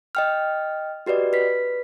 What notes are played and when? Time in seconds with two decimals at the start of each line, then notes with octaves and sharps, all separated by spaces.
0.15 D#5 G5 F6
1.06 F#4 G4 B4 D5 D#5
1.33 B4 B6